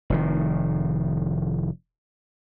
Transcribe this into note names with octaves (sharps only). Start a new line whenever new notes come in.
F1 A2 D#3